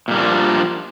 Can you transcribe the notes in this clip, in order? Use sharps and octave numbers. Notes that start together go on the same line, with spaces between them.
A#2 F3 G3 A#3 D4